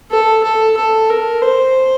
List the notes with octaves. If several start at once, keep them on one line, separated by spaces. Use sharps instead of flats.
A4
A4
A4
A#4
C5